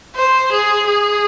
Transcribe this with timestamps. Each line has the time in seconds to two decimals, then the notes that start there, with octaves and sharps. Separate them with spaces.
0.15 C5
0.51 G#4
0.87 G#4